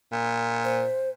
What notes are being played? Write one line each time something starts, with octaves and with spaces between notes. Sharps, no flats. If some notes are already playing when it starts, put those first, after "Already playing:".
A#2
C5